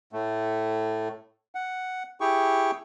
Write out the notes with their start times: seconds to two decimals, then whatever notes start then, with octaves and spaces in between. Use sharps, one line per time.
0.13 A2 A3
1.55 F#5
2.21 E4 G4 G#4 G5 C#6